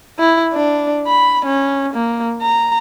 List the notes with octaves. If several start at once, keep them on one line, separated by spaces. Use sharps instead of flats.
E4
D4
B5
C#4
A#3
A#5